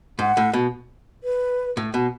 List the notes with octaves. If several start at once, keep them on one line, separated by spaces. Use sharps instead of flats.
G#2 F#5
A2
B2
B4
A2
B2